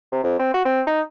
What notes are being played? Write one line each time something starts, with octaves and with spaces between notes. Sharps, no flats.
C3
F2
C4
F#4
C4
D#4